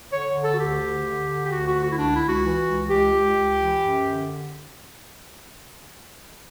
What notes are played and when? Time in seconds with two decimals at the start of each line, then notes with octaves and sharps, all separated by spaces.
0.11 D3 C#5
0.34 D3
0.43 A4
0.53 F#4
0.58 D2 G4
0.81 D3
1.05 D3
1.27 D3
1.44 G4
1.50 D2 F#4
1.66 F#4
1.74 D3
1.81 F#4
1.91 E4
1.96 C#2 D4
2.13 E4
2.19 C#2
2.28 F#4
2.43 E3
2.66 C#2
2.89 C#2 G4
3.13 C#2
3.36 C#2
3.58 E3
3.82 F#2
4.05 D3